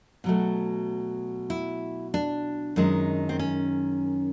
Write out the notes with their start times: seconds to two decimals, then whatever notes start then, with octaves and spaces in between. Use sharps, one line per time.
0.24 B2 F#3 A3
1.50 E4
2.14 D4
2.76 F#2 D#3 G#3
3.29 C4
3.39 C#4